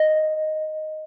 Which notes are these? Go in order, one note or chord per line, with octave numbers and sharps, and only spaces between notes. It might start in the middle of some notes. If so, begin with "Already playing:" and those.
Already playing: D#5